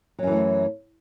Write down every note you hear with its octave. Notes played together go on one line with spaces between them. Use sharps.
F#2 E3 F#3 A3